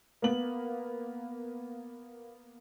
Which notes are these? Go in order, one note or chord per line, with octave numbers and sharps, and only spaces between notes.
A#3 B3 F#7